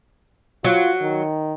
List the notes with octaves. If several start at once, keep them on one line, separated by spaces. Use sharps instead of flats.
F#3 F4
D#3